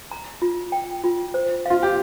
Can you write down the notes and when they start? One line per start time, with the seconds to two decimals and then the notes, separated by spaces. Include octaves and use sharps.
0.11 A#5
0.42 F4
0.72 G5
1.04 F4
1.34 C5
1.66 F4 F5
1.83 G4